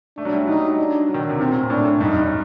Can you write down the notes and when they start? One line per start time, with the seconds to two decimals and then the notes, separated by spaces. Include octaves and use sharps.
0.17 A3 D4
0.25 F#3
0.32 G3
0.48 F#3 D#4
0.79 D4
1.09 F#3
1.14 D#3
1.19 D3
1.29 C3
1.39 A#2 C4
1.50 A#2
1.59 A2
1.70 A2 D4
1.85 A2
2.01 G2 D#4
2.08 F#2
2.16 G2